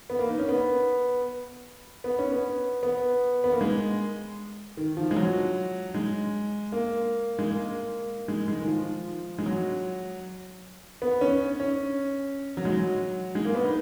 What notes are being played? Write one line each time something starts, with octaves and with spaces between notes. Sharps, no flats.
B3
A#3
D#4
C#4
B3
B3
C#4
B3
B3
B3
A#3
G#3
D#3
F3
G#3
F#3
G#3
A#3
G#3
A#3
G#3
G#3
D#3
F3
G#3
F#3
B3
C#4
C#4
F#3
G#3
F#3
G#3
A#3
B3
D#4